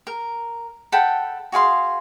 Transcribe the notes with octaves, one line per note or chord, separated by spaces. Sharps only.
A#4
A4 F#5 G5 B5
F#4 G#4 F5 C6